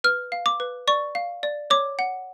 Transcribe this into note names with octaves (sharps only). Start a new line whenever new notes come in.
B4 F6
F5
D6
B4
D5 C#6
F5
D5
C#5 D6
F#5